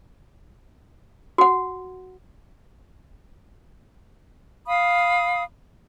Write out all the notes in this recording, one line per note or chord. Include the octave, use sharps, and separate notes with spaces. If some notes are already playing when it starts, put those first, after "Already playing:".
F#4 F#5
F5 B5 D#6